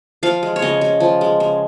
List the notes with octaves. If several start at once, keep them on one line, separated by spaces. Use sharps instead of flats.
F3 F5
G#3
C#5
C#3 D#5
C#3
F3
G#3
C#3